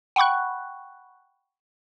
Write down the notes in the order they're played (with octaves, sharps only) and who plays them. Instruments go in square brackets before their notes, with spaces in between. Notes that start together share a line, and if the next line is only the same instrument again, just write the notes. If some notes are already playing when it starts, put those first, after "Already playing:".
[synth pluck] F#5 G5 B5 C#6 F#6